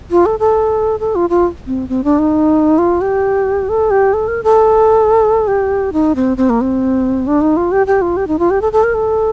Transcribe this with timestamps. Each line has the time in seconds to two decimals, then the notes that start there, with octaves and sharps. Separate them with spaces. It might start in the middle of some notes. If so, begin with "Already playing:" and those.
0.11 F4
0.26 A4
0.40 A4
1.00 A4
1.15 F4
1.30 F4
1.67 C4
1.89 C4
2.04 D4
2.19 D#4
2.78 F4
3.01 G4
3.69 A4
3.91 G4
4.14 A4
4.28 A#4
4.43 A4
5.48 G4
5.93 D#4
6.16 C4
6.37 C4
6.50 A#3
6.61 C4
7.27 D4
7.41 D#4
7.57 F4
7.72 G4
7.87 G4
8.02 F4
8.17 G4
8.28 D#4
8.39 F4
8.51 G4
8.62 A4
8.73 A4
8.84 A#4
8.94 A4